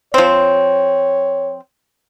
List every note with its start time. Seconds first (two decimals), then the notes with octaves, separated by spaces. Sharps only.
0.14 F3 C4 C#5